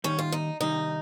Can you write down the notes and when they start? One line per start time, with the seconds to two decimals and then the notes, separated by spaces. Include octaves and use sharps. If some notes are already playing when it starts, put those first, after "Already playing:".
0.04 D#2 D#3 G3 C#4
0.19 F4
0.32 D#4
0.60 C3 D#3 G3 D#4